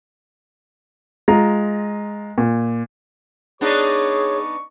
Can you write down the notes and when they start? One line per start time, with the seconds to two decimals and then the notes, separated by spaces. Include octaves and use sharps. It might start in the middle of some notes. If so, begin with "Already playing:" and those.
1.28 G#3 F4 A#5
2.38 A#2
3.61 B3 D4 D#4 G#4 C#5 C#6